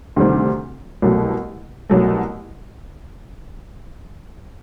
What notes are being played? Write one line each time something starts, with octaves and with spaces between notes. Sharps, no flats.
D2 C3 D#3 G3 C4
C2 B2 F#3 A3
C2 B2 F#3 A3